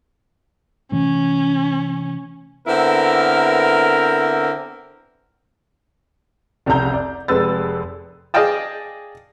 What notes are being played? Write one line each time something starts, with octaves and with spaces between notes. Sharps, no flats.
C3 E3 A3 C#4
D3 B3 C4 E4 A#4
F1 C2 C#3 A#5 G6
D5
F1 F2 G#3 B4 E6 A6
G#4 D5 D#5 F5 G5 A5